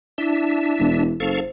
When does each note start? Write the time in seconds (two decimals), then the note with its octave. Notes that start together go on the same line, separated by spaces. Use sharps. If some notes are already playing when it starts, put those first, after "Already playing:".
0.18 D4 E4 E5
0.80 E1
1.20 F#1 A4 C5 F5 C#6